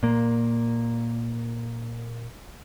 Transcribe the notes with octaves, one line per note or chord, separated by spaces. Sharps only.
A#2 A#3